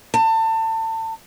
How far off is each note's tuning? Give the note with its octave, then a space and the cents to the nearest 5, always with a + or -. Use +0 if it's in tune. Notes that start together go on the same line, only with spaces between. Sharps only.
A5 +30